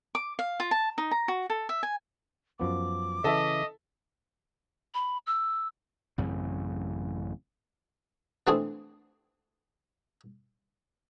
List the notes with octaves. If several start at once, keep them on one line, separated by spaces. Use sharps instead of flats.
D6
F5
F4
A5
D#4
A#5
F#4
A4
E5
G#5
F#2 F3 B3 D6
C#3 E3 A4 D#5 E5
B5
E6
A1 F#2 C#3 C4
E3 G#3 A3 C4 D4 G#4